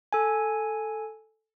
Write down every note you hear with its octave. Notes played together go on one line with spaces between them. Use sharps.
A4 G#5